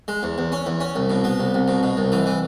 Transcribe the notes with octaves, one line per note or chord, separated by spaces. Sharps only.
G#3
E2
E2
C#4
E2
C#4
C2
B2
B3
C2
C2
B2
B2
C2
E3
E3